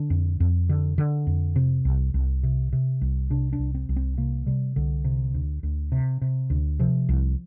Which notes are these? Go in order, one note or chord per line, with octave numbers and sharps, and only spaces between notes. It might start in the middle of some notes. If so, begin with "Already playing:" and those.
Already playing: D3 D4
F2
F2
D3
D3
F2
C3 C4
C2
C2
C3
C3
C2
C3 D4
D4
C2
C4
C2
C4
C3 A#3
C3 G3
C2 D3
C3
D2
D2
C3
C3
D2
C3 F3
C2